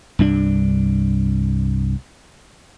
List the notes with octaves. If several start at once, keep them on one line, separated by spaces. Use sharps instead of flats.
C2 G2 D4